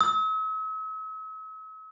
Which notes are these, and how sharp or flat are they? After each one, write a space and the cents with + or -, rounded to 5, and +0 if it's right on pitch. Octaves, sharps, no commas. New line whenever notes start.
E6 -45